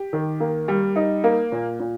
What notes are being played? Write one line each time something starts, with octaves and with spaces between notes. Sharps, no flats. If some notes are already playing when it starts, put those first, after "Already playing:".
Already playing: G4
D#3
A#3
G3
D#4
A#3
A#2
A#2